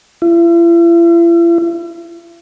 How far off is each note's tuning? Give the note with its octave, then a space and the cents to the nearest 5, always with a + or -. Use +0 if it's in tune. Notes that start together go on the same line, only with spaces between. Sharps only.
E4 +45